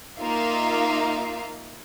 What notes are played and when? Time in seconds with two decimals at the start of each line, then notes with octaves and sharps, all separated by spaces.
0.19 A#3 D#4 F4 E5 F5